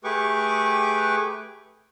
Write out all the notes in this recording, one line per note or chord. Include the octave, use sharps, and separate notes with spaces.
A3 G4 G#4 B4 C#6 D6